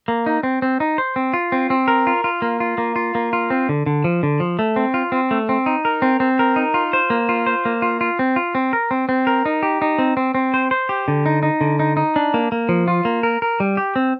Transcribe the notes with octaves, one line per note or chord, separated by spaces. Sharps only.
A#3
D#4
C4
C4
D#4
C5
C4
F4
C4
C4
A#4
F4
F4
A#3
F4
A#3
F4
A#3
F4
C4
D3
D3
F3
D3
F3
A3
C4
F4
C4
A3
C4
D#4
A#4
C4
C4
A#4
D#4
F4
C5
A#3
F4
C5
A#3
F4
F4
C4
F4
C4
A#4
C4
C4
A#4
D#4
G4
D#4
C4
C4
C4
C5
C5
G4
D3
D#4
D#4
D3
D#4
D#4
D4
A#3
A#3
F3
F4
A#3
A#4
A#4
G3
G4
C4